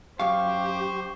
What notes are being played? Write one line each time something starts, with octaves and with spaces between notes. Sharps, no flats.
F#2 G4 C5 F5 C#6